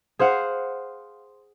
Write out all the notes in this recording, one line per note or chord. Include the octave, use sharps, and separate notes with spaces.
G#4 C5 F5 F#5